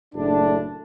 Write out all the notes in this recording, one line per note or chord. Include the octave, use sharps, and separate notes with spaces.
F#1 A2 D4